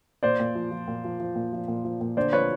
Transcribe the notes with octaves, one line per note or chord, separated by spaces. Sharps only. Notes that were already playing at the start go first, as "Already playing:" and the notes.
A#2 C5 D5
A#2
F3
F3
A#2
F3
F3
A#2
F3
A#2
F3
A#2
D3 C5 D5
F3 B4 C#5